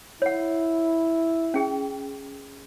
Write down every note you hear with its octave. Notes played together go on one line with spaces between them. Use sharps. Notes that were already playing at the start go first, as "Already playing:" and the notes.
E4 C#5 F#5
C#4 G#4 G5